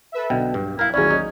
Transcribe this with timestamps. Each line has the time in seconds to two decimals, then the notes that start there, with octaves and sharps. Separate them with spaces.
0.12 A4 B4 E5
0.30 B1 B2 D3 G5
0.54 G2
0.79 E4 A#4 F5
0.94 A1 D#2 F#3 C#4 E4 G#4 A#4 D5
1.11 D#4